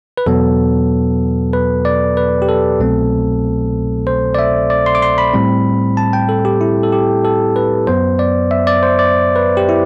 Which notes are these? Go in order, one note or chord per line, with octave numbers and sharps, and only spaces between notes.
B4
E2 B2 F#3 B3 A4
B4
D5
B4
G4
A4
C2 B2 F#3 A3 C4
C5
D5
E5
D5
C6
D6
C6
B5
A2 G3 C4
A5
G5
A4
G4
E4
A4
G4
A4
B4
F#2 F#3 B3 C5
D5
E5
D5
C5
D5
B4
G4
E4